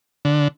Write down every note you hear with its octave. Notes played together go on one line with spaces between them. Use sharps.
D3